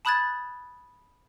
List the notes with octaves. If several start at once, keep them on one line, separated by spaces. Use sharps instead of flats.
A5 B5 D#6 F#6 G#6 A6